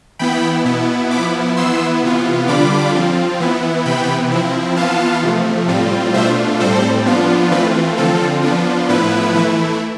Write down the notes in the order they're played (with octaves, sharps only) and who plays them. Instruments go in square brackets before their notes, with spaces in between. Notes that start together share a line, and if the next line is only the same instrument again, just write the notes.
[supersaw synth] E3 B3 E4 G5 B5
B2 B3 E4
F3 B3 E4 B5 D6
E3 B3 E4 C6 E6
C3 E3 B3 F4
D3 G3 D4 F4 B5 D6
F3 C4 F4
E3 B3 E4
C3 E3 B3 G5 B5
F3 C4 E4
E3 B3 F4 F5 A5
C3 F3 A3
A2 G3 C4 F4
B2 A3 D4 F4 C5 E5
A2 G3 C4 A4 C5
F3 B3 D4 F4
E3 A3 C4 F4 B4
D3 F3 C4 F4 A4
F3 B3 D4 F4
A2 F3 B3 E4 B4
E3 A3 E4